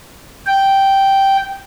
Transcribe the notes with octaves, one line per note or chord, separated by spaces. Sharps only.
G5